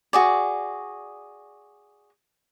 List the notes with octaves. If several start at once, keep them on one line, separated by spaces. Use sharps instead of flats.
F#4 G#4 D5